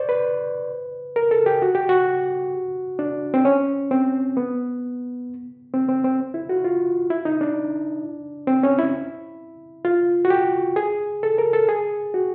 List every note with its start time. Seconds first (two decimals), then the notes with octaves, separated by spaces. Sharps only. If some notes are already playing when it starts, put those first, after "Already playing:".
Already playing: C5 D5
0.09 B4
1.16 A#4
1.31 A4
1.46 G4
1.62 F#4
1.75 G4
1.89 F#4
2.99 D4
3.34 C4
3.45 C#4
3.91 C4
4.37 B3
5.74 C4
5.89 C4
6.04 C4
6.34 E4
6.49 F#4
6.64 F4
7.10 E4
7.25 D#4
7.41 D4
8.47 C4
8.63 C#4
8.79 E4
9.85 F4
10.25 F#4
10.30 G4
10.76 G#4
11.23 A4
11.38 A#4
11.53 A4
11.69 G#4
12.14 F#4